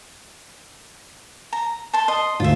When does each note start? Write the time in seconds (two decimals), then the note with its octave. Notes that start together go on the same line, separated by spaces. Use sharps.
1.53 A#5
1.93 A5 C6
2.08 D#5 C6
2.40 D2 G#2 F4 E5